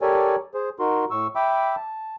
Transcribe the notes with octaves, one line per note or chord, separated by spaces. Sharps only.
G4 A4 A#4 C#5 D5 G#5
G#4 C5
D#4 F#4 A#4 C6
A2 C#6 E6
E5 G5 B5 D6 E6
A5